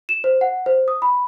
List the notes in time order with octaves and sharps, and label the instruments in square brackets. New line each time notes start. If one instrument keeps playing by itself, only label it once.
[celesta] E7
C5
F#5
C5
D#6
B5